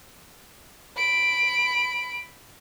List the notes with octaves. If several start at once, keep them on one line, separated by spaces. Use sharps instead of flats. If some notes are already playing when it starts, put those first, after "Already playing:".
B5 D7